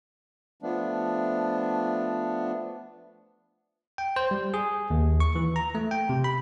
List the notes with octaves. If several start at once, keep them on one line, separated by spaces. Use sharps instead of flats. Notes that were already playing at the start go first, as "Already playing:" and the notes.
F3 A3 B3 D4
G5
C5
G3
G#4
D#2
C#6
E3
A#5
A3
G5
C3
B5